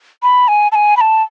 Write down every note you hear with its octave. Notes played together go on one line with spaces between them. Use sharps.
B5
G#5
A5
G#5
B5
A5